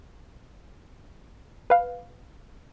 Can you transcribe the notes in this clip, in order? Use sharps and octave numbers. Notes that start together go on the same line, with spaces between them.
B4 F5